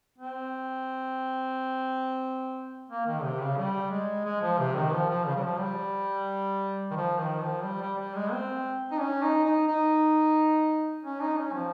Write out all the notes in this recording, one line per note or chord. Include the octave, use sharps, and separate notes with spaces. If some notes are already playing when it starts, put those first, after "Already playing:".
C4
A#3
D#3
C3
C#3
G3
G#3
G#3
F3
C3
D#3
F3
F3
C#3
G3
F3
G3
D#3
F3
D#3
F3
G3
G3
G3
G#3
C4
D#4
C#4
D#4
D#4
D#4
C#4
D#4
C#4
F3